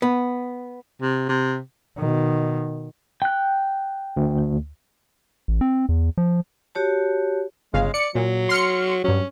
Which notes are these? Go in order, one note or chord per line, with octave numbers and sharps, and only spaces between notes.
B3
C3
C3
B2 D#3
G5 F#6
D2
A1
C4
E2
F3
F#4 G4 C#5 A5
G1 C#3 G#3 F5
D5 C#7
A#2 F#3
C6 F6 C#7
G2 F#3 C#4